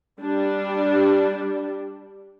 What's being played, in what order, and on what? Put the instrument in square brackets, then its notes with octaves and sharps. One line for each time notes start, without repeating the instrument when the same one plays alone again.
[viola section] G3 D4